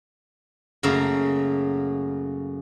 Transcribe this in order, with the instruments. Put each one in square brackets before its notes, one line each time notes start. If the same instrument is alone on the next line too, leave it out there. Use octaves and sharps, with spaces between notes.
[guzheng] F#2 C#3 A3 A#3